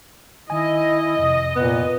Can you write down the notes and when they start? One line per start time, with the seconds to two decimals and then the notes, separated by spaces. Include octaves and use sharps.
0.50 D#3 E4 D#5 G#5
1.19 F2 C3
1.56 A#2 B3